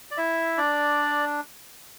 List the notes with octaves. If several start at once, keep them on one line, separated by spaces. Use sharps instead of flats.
D5
E4 E5
D4 D5